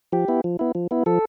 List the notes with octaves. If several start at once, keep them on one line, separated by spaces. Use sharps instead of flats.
F3 G4
B3 E4
F3
B3 E4
F3
B3 E4
F3 A4